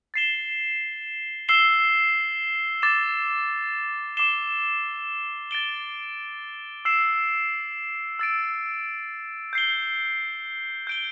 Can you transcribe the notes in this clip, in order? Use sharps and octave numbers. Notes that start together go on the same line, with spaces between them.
A6 C7 E7 G7
E6 C7 E7 G7
D6 A6 E7
D6 C7 E7 G7
A6 D7 G7
E6 C7 E7
E6 A6 D7
G6 C7 G7
G6 D7 G7